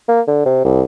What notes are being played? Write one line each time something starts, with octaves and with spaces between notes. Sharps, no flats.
A#3
D3
C3
C2